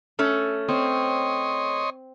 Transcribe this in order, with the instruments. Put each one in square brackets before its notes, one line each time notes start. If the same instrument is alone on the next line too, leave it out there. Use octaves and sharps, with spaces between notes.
[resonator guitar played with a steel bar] A3 C#4 A4
[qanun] C4 [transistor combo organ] C#5 D#5 C6